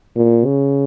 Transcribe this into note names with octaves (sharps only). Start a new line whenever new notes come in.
A#2
C#3